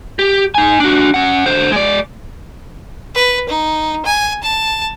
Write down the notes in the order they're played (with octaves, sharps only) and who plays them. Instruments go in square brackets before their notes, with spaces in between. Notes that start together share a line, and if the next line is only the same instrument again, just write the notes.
[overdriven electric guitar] G4
D#4 G#5
D4 F#4
C#4 F#5
D3 C5
G#3 D5
[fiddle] B4
D#4
G#5
A5